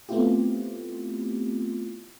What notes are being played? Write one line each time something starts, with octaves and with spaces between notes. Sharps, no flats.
A3 B3 C4 E4 F4 G4